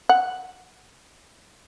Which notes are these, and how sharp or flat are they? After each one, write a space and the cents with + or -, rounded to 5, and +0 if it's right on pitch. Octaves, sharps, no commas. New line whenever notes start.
F#5 +0